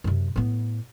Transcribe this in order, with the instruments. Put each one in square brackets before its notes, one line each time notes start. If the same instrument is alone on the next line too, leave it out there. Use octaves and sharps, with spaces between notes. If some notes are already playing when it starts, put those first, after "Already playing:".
[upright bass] F#2 C3
A2 B3